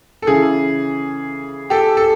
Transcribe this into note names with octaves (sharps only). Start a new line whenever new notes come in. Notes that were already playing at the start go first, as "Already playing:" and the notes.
A4
C#3 E3 G#4
G4 A4
A4